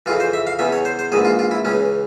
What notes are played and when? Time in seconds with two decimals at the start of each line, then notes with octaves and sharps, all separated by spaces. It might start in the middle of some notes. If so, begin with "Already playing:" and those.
0.06 F2 C#3 E3 F4
0.20 C5
0.33 E5
0.47 F5
0.59 E2 C#3 E3 E5
0.72 C#5
0.85 C5
0.99 C5
1.12 A#1 G#2 E3 G#4
1.25 F4
1.39 F4
1.51 E4
1.65 C#2 C#3 E3 C#4